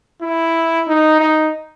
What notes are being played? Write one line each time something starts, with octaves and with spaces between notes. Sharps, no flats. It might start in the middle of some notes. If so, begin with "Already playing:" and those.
E4
D#4
D#4